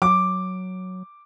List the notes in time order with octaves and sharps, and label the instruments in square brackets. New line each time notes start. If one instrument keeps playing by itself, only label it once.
[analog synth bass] F#3 [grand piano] D6